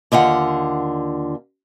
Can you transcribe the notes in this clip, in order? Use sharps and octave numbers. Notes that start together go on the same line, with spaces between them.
D#2 D3 F4 F#5